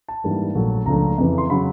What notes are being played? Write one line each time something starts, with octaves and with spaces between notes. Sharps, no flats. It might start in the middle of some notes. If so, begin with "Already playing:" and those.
A5
G#2 E3 G3 A#3 D4
A#1 A#2 F#3 A3
C#2 C#3 F3 A3 D4 A#5
F2 C#3 E3
C6
C#3 F#3 B5